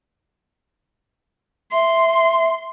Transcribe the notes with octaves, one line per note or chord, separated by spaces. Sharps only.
E5 C6